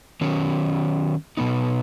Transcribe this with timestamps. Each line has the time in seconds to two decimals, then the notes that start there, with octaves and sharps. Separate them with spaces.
0.21 D#3 F#3 C#4
1.37 B2 B3 D#4